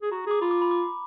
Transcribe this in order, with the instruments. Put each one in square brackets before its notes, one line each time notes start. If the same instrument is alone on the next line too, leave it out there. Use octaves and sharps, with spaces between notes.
[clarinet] G#4
[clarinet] F#4 [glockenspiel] A#5
[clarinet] G#4 [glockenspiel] D6
[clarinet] F4 [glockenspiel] B5
[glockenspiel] D6
B5
D6